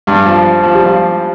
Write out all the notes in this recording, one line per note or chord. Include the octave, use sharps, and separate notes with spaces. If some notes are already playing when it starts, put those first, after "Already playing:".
G2
F3
F3
G3
F3